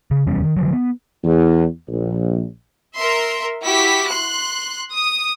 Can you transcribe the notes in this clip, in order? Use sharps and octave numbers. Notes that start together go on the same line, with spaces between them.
C#3
F1 E2 G3 C#4
D#3
D3 F3 F#3
B3
E2
A#1
A#4 E5 C6
E4 F#4 G4 B6
C6 F#6
D#6